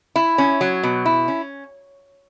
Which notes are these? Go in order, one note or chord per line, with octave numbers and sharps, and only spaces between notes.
E4
C#4
F#3
B2
E4
C#4